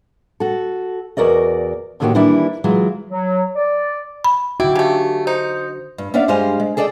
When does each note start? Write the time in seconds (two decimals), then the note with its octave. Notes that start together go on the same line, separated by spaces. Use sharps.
0.40 F#4 A4
1.17 E2 F#4 A#4 D5 D#5
2.00 A2 D3 D#3 A#3 F#4 G4
2.15 D#3 E3 G3 A#3 D4 E4
2.64 E3 F#3 G#3 F4
3.10 F#3
3.56 D5
4.24 B5
4.60 D3 D#4 E4 F#4 G5 D6
4.75 C#3 A3 G4
5.27 D#4 C5
5.98 G2
6.14 B3 C#4 D4 D5 E5 F5
6.28 G2 G3 G#3 C5 F5 G#5
6.60 G#3
6.77 G#4 A4 D5 D#5 F5 G5